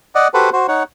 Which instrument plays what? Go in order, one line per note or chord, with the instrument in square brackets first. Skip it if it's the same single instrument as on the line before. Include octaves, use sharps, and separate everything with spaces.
[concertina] D5 D#5 F#5
F#4 G4 A4 B4 C5 F#5
F#4 C5
D#4 C#5 F#5